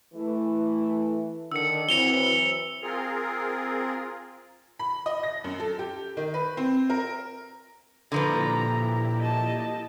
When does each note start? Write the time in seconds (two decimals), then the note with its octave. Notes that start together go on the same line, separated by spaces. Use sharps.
0.14 E3 A3
1.52 D3 D#3 E6 C#7
1.89 E3 F#3 C4 C#7 F7 G7
2.83 C4 F4 G#4 A#4
4.79 B5
5.06 D#5
5.23 A#6
5.44 F#2
5.60 A4
5.79 G4
6.17 D#3
6.34 B4
6.57 C4
6.90 A#4
8.12 A#2 D3 F3 E4 G4 B4 A#5
9.20 D#5 A5